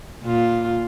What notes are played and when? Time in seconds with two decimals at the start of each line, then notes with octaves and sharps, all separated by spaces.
0.23 A#2 F4